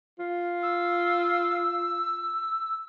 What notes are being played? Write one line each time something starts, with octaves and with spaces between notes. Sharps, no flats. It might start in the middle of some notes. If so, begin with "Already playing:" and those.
F4
E6